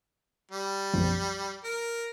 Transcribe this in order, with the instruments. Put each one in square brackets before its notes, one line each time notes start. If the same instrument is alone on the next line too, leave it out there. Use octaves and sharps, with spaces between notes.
[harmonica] G3
[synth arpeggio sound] B1 F#2 F3
[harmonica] A#4